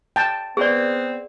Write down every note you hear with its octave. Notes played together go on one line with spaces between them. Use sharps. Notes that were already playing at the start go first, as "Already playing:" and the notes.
G5 A5
B3 C4 G#4 D5